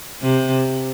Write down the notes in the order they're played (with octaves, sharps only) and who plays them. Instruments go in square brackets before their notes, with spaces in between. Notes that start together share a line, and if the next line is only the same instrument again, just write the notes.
[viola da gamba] C3